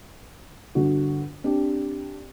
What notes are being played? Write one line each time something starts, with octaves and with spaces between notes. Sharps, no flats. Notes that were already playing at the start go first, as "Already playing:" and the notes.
G1 D3 F#4
C4 D4 G4